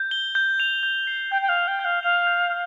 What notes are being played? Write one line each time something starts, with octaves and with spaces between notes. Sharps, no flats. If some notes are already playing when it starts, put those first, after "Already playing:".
Already playing: G6
G7
G6
F7
G6
C7
G5 G6
G5
F5
F7
G5
G6
F5
F5 F7
G6